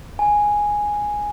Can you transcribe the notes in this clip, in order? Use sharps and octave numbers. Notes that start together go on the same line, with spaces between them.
G#5